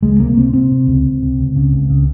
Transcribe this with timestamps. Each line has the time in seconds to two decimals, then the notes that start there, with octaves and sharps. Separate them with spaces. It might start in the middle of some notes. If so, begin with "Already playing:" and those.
0.03 C#2 G#3
0.19 C3 A#3
0.37 C3 C4
0.53 C3 C4
0.72 C3
0.87 C#2
1.05 C#2
1.22 C3
1.39 C#2
1.56 C#3
1.73 C#2
1.90 C#3